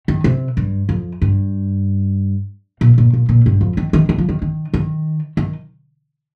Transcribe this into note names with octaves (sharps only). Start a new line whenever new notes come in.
D#3
C3
G2
F2
G2
A#2
A#2
A#2
A#2
G2
F2
D#3
D#3
D#3
F3
D#3
D#3
D#3
D#3